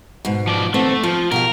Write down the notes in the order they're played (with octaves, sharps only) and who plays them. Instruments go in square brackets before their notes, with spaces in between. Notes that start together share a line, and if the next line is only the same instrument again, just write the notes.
[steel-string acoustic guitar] G#2 B2
[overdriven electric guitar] F3 D5
[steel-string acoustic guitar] D#2 B3 C4 [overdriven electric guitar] A3
[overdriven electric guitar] F3 [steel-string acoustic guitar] F4
[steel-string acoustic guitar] B2 G4 F5 [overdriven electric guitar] A#4